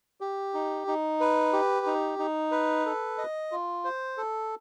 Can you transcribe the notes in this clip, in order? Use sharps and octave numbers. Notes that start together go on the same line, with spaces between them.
G4
D#4
D#4
B4
G4
D#4
D#4
B4
A4
D#5
F4
C5
A4